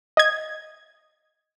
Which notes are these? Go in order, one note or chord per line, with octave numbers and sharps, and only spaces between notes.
D#5 G#6